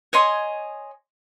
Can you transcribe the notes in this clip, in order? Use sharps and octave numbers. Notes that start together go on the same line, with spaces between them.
C#5 D#5 G#5 C6